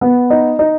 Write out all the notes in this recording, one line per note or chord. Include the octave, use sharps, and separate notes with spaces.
B3
D#4
D#4